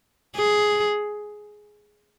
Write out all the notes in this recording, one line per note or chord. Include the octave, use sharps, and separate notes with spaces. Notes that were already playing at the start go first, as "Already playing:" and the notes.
G#4